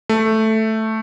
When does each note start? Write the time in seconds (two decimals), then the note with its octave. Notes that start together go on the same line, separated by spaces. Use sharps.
0.09 A3